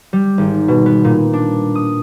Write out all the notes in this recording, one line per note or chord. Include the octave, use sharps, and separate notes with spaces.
G3
G#1
B2
B3
A#2
D4
D#6